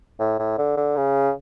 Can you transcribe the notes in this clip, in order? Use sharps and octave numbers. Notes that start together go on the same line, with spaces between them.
A2
A2
D3
D3
C#3